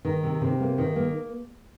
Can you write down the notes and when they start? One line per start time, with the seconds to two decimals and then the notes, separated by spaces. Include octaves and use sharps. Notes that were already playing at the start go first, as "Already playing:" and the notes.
0.05 D#3
0.23 C3
0.41 C3
0.60 A#3
0.78 D#3
0.96 A#3